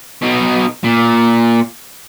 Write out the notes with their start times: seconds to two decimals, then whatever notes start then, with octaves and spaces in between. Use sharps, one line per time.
0.22 B2 D#4
0.84 A#2